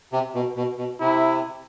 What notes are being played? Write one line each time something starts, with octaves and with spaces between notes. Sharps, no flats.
C3
B2
B2
B2
C3 E4